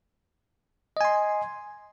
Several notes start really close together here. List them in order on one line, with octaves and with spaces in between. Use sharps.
D#5 G#5 C6